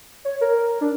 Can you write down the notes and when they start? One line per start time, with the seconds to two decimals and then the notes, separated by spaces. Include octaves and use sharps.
0.25 C#5
0.41 A#4
0.81 D4